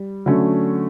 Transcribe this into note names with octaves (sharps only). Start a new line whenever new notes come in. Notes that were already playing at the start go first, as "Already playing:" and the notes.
Already playing: G3
D3 F#3 A3 C#4